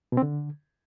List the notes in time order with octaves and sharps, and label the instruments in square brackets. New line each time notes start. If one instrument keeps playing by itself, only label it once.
[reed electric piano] B2
C4
D3